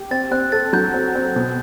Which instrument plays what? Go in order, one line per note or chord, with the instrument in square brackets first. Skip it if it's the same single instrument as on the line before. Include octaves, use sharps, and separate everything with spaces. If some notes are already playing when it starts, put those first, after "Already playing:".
Already playing: [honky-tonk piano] G4
[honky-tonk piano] C4 [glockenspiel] A6
[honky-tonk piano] C4 [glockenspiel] F#6
[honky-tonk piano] A4 [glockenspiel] A6
[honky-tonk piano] F#3 [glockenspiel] G6
[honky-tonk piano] C4
C4
B2